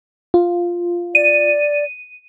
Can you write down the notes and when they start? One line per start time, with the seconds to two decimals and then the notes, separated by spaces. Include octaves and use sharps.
0.34 F4
1.15 D5 D#7